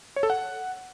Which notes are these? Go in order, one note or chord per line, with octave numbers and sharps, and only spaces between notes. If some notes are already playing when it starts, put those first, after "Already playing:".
C#5
A4
F#5